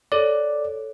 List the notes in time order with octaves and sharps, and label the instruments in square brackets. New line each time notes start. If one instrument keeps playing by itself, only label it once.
[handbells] A4 C#5 [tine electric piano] D5